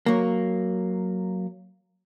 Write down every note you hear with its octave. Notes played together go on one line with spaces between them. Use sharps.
F#3 A#3